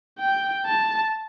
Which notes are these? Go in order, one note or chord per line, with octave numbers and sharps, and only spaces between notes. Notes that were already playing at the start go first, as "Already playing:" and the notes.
G5
A5